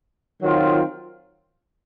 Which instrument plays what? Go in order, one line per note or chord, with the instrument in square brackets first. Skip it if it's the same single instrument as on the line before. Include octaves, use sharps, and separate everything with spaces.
[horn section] D#3 F#3 C4 F4